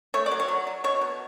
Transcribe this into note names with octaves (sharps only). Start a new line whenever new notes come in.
A3 C#5
D5
F#3
C#5
F#3
F#3
B2 C#5
B2